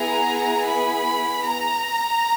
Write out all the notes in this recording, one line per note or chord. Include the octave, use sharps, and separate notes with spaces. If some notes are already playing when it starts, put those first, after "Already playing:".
Already playing: B3 E4 G#4 A#5
B5
A#5